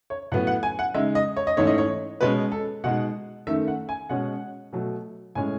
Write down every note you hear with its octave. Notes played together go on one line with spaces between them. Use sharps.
C#5
A2 F#3 B3 F#5
F#5
G#5
F#5
C#3 G#3 D#4 E5
D#5
C#5
D#5
G#2 E3 A3 C#4 C#5
D#5
C#5
B2 G#3 C#4 B4
A4
B2 G#3 D#4 F#5
F#2 D#3 A3 E5
F#5
G#5
B2 G#3 C#4 F#5
B2 F#3 A3
A2 G#3 C#4 G#5